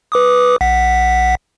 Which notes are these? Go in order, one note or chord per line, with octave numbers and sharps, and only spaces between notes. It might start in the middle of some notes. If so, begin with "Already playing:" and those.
B4 D6 D#6
A#1 F#5 B6